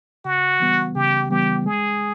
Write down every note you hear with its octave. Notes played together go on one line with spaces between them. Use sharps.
C#3 F#4
E3 G3 B3
C#3 G4
E3 G3 B3 G4
G#3 G#4